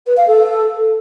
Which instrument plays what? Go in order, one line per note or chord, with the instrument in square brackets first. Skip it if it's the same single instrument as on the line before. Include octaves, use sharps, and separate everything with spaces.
[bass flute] B4
F5
A4